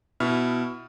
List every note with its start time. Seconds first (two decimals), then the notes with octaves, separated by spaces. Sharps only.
0.20 B2 E4 E5 F6